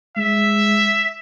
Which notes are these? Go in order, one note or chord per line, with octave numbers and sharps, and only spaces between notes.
G#3 E5